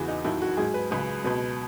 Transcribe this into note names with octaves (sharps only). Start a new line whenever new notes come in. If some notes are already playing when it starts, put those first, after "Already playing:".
Already playing: E2 C#3 E3 F#4
D#4
D#2 D#3 F#3 E4
F#4
G#2 F#3 G#4
B4
C#2 C#3 F#3 B4
C#2 B2 F#3 B4